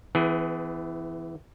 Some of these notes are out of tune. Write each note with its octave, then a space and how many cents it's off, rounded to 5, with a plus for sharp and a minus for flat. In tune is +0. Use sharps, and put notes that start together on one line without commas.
E3 +0 B3 +40 G#4 +15